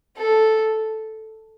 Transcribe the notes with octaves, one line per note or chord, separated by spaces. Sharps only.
A4